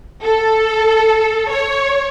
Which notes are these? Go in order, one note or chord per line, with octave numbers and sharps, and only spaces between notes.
A4
C#5